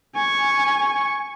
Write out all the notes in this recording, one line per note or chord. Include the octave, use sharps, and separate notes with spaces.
G#5 C#6